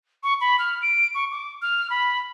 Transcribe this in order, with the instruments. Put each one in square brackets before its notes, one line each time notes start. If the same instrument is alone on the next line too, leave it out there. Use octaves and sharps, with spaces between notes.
[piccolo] C#6
B5
F6
D7
C#6
D6
F6
B5